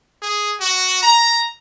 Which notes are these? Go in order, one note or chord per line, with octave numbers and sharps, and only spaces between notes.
G#4
F#4
A#5